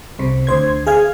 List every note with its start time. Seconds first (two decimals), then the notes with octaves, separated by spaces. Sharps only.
0.19 C2 C3
0.47 D2 C5 G#6
0.86 G#4 F5 G#6